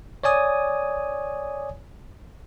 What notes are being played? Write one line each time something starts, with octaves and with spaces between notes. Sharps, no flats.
C#5 D5 G#5 D#6